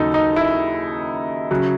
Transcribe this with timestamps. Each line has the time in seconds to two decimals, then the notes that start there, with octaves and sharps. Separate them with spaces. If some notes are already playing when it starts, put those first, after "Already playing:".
Already playing: D#2 C#3 F#3 D#4 A4
0.14 D#4
0.36 E4
1.51 C#3 F#3